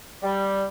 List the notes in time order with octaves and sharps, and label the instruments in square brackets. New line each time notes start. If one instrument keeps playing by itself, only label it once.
[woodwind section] G3